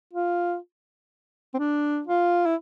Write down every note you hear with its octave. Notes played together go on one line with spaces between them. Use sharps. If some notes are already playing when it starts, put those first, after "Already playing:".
F4
C4
D4
F4
E4